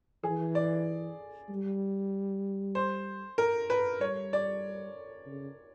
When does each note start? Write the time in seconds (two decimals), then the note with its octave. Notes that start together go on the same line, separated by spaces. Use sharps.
0.23 E3 G#4
0.55 D5
1.49 G3
2.75 C5
3.38 A#4
3.70 B4
4.01 G3 C#5
4.33 D5
5.27 C#3